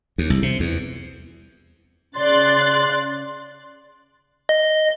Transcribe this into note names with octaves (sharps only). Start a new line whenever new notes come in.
D#2
C2
C3
E2
C#3 D5 C6 F#6 A6
D#5